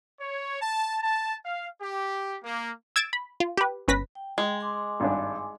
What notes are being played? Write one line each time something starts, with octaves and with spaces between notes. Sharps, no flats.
C#5
A5
A5
F5
G4
A#3
E6 G#6 A6 D7 E7
B5
F4
G4 B4
G1 C#4 B4 A#6 B6
G5
G#3 G5
G#5 C6 D6
G#1 G2 D4